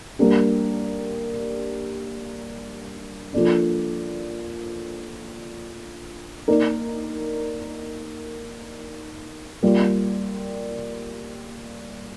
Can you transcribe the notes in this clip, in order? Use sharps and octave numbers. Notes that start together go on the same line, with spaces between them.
G3 A#3 D4 G4
F3 A#3 D4 A4 D5
A#3 D#4 A#4 D5
G3 A#3 F4